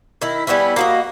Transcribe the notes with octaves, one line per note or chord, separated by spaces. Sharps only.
D#3 E4
G3 B3 C#4 E4
A#3 F#4 D#5